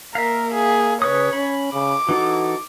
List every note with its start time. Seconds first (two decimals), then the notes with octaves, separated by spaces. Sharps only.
0.15 A#3 A#4 E5 F5
0.54 G#4
1.02 C#3 B4 C#5 D#6
1.33 C#4 B5
1.73 C#3 D6
2.09 E3 D#4 F#4 A4